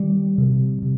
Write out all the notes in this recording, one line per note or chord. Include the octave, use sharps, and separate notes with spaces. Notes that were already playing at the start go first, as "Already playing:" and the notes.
Already playing: D#3 G3
C3
C3